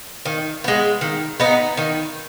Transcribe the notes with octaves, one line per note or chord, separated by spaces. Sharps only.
D#3
G#3 B3
D#3
B3 D#4
D#3